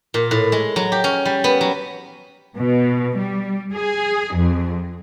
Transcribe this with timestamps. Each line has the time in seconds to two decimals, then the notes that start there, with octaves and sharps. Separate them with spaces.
0.14 A#2
0.31 A2
0.52 G#3
0.76 F#3
0.92 G4
1.04 C#4
1.25 G3
1.44 B3
1.61 F#3
2.57 B2
3.17 G3
3.74 G#4
4.36 F2